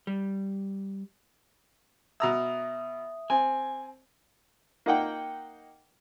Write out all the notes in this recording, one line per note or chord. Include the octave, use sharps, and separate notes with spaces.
G3
B2 E5 A#5 D#6 E6
C4 G#5
A#3 D#4 F#5 G5